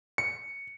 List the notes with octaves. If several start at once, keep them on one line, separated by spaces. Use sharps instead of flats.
C#7